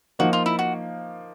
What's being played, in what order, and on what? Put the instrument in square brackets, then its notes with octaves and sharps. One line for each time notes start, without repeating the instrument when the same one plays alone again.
[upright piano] F3 A#3 D#4 [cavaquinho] F#4
[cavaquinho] F4
E4
F#4